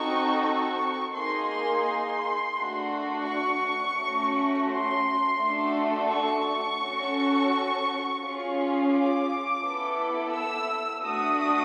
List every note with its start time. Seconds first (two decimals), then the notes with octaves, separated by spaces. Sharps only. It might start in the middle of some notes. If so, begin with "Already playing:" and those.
Already playing: C4 D#4 F#4 A4 C#6
0.43 C#6
1.14 A#3 D#4 G#4 C6
1.49 C6
1.86 C6
2.55 A3 D4 F#4
3.26 C#6
3.97 A3 C#4 F#4
4.68 C6
5.38 A3 D4 F#4 A4
6.09 C#6
6.80 C#4 F#4 A4
8.21 C#4 F4 G#4
8.92 D6
9.62 B3 E4 A4
10.33 E6
11.04 A3 D4 F#4 A4 D#6